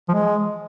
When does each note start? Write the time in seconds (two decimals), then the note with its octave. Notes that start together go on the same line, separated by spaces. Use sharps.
0.09 F3
0.14 G#3